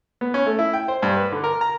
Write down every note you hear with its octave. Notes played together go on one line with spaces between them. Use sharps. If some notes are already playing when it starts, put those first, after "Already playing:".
B3
C#4
A3
E4
G5
C5
G2
B4
D3
A#4
A#5